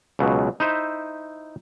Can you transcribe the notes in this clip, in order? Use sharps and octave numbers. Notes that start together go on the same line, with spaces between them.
C#2 B2 F#3
D#4 E4 C5 E5